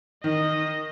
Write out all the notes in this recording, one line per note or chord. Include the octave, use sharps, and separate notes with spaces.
D#3 D#5